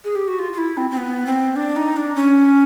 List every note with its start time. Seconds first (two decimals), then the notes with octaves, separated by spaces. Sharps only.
0.04 G#4
0.15 G4
0.28 F#4
0.39 F4
0.53 F4
0.58 E4
0.77 C4
0.91 C4
0.97 B3
1.26 C4
1.56 D4
1.76 D#4
1.96 D4
2.16 C#4